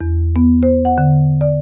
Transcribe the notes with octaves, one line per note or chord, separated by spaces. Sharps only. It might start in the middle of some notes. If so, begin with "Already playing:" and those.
E2
B3
C5
F#5
D3
D5